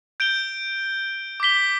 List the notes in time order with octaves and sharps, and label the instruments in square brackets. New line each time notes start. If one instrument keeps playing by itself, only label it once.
[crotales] G6 D7 G7
D6 B6 G7